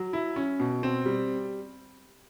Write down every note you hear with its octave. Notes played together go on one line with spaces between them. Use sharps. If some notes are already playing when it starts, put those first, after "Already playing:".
Already playing: F#3
E4
C#4
B2
C4
G3